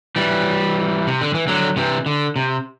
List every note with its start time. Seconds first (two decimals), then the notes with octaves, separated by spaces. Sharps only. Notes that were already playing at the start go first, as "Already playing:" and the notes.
0.16 E3 G3
1.07 C3
1.21 D3
1.34 E3
1.48 D3 F#3
1.76 C3 E3
2.06 D3
2.36 C3